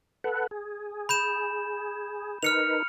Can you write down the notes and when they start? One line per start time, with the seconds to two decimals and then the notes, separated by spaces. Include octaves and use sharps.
0.24 A4 B4 F#5
0.51 G#4
1.09 B5 G6 E7
2.43 D#4 A#4 B4 F6 C#7 F7